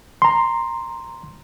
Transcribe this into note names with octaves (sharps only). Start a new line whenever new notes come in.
A#5 C6